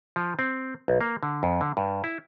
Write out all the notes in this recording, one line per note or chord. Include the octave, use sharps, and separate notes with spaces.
F3
C4
B1
A#3
D3
F2
D3
G2
E4